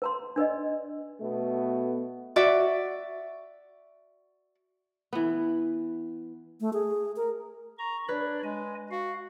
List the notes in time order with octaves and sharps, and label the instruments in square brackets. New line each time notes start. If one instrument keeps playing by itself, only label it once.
[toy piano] B4 A#5 C6
D4 B4 D5 D#5
[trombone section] B2 A3 B3
[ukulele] F#4 D5 E5
[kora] E3 B3
[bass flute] A3
G#4
A#4
[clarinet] A#5 [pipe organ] C#6
[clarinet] D4 [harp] B4 [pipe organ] C#5 D5 B5
[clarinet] G#3 [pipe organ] D#5 G#5
[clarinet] F#4 [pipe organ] F5